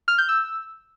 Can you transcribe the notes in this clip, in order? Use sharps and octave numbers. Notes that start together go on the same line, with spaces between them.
F6
G6
E6